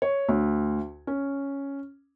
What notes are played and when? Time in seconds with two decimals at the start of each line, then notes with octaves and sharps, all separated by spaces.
0.02 C#5
0.29 D2
1.07 C#4